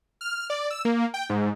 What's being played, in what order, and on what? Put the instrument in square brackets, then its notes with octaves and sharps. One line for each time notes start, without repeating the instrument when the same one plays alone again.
[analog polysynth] F6
D5
E6
A#3
G5
G#2